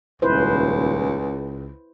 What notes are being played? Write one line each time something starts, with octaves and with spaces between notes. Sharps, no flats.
D#1 C#2 E4 B4 C5